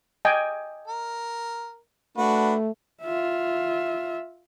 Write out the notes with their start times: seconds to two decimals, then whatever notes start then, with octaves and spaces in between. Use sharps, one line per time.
0.25 D#5 G5 G#5
0.88 A#4
2.17 A3 D4 F#4 B4
3.03 F4 E5